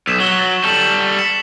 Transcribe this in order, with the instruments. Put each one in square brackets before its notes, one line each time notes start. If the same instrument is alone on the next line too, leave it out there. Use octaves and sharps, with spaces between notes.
[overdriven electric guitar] B1 [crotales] E6 B6 E7
[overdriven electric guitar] F#3 [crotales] E6 G7
[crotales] A6
[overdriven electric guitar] G3 A4 [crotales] C#6 F#7
[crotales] B6 C#7 E7